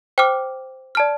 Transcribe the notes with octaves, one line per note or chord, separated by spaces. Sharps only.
C5 G5 D6 F6
D5 A5 F6